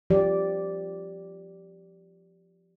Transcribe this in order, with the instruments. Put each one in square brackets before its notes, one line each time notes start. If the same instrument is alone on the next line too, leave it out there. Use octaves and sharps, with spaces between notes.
[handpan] F3 G4 D5